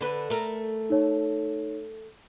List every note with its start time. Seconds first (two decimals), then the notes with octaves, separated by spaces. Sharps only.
0.01 D3 B4
0.30 A3 A#4
0.90 D#4 C#5